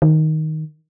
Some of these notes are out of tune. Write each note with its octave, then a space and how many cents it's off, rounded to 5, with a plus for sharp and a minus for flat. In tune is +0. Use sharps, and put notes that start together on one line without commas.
D#3 +5